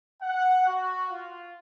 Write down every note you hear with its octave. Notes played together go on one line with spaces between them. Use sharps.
F#5
F#4
F4